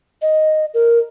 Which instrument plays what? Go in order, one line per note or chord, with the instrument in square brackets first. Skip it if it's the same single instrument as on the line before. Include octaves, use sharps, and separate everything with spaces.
[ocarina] D#5
A#4